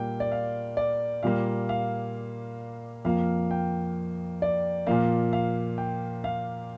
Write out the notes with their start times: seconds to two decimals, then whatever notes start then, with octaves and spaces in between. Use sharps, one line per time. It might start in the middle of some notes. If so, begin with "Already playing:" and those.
Already playing: A#2 G3 A#3 G5
0.20 D5
0.32 F5
0.77 D5
1.23 A#2 G3 A#3 F5
1.69 F5
3.05 F2 F3 A#3 F5
3.51 G5
4.42 D5
4.87 A#2 F3 A#3 F5
5.33 F5
5.78 G5
6.24 F5